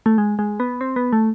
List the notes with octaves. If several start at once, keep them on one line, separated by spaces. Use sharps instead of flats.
A3
G#3
G#3
B3
C4
B3
A3